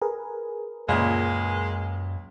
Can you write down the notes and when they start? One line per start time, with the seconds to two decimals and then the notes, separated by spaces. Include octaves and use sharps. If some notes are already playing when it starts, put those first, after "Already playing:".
0.02 G#4 A#4 B4
0.89 C#2 F#2 A#2 G#3